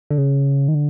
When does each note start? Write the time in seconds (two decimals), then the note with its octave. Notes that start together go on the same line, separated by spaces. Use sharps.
0.10 D3
0.18 C#3
0.68 D#3
0.75 D3